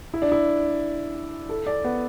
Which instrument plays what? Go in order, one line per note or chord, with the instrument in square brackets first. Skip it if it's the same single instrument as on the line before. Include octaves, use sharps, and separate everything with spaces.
[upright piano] E4
D4
E4
A4
D5
B3